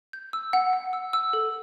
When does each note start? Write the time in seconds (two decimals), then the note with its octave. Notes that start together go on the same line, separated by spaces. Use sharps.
0.13 G6
0.33 E6
0.53 F#5
0.73 F#5
0.93 E6
1.13 E6
1.33 A4